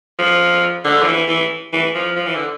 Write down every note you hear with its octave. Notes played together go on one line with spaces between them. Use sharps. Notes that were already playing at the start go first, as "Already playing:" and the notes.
F3
D3
F3
E3
E3
E3
F3
F3
E3
D3